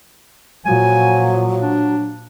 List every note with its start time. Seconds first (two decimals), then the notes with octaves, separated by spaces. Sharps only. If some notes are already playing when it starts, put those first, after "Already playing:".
0.66 A#2 F3 F#3 G#5
1.62 D4